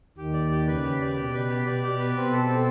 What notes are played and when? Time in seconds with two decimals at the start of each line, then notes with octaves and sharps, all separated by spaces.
0.17 D#2 D#3 G4
0.34 D5
0.51 G4
0.67 C#3 B4
0.84 G4
1.01 D5
1.16 B2 G4
1.33 B4
1.50 G4
1.66 B2 D5
1.83 G4
1.99 B4
2.16 B2 C4
2.32 A4
2.49 C4